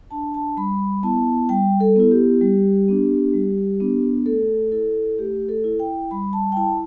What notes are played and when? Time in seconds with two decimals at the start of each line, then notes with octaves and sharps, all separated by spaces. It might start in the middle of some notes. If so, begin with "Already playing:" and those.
0.11 D4 A5
0.34 A5
0.57 G3 B5
1.03 B3 E4 A5
1.49 G3 G5
1.80 A4
1.96 B3 E4
2.11 G4
2.41 G3
2.88 B3 D4
3.33 G3
3.80 B3 D4
4.26 A3 A4
4.72 E4 A4
5.18 A3 G4
5.49 A4
5.64 E4
5.79 G5
6.11 G3 B5
6.33 A5
6.52 G5
6.57 E4 A5